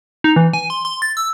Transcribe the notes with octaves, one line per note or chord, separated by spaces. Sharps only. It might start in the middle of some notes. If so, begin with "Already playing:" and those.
D#4
E3
G#5
C6
C6
A6
E6